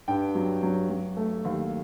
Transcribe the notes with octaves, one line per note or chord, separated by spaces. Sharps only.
G2 G5
F#3
F#3
F#3
A3
D#2